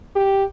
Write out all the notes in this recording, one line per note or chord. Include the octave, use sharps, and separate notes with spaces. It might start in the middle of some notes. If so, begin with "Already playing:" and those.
G4